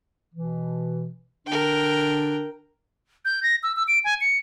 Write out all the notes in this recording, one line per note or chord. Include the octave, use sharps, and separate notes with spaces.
B2 E3
D3 D4 A#4 G5
G6
A#6
E6
E6
D7
G#5
C#7